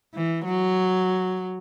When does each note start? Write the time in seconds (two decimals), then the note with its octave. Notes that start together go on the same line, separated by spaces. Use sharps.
0.14 E3
0.45 F#3